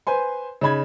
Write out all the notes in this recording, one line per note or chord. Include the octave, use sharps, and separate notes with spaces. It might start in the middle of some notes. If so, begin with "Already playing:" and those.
B4 C5 G#5 C6
C#3 D#4 B5 G#6